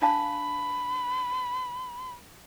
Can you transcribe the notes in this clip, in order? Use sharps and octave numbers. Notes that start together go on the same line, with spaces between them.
D4 F5 A5 B5